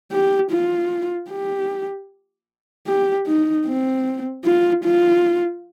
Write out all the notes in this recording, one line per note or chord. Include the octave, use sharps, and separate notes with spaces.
G4
F4
G4
G4
D#4
C4
F4
F4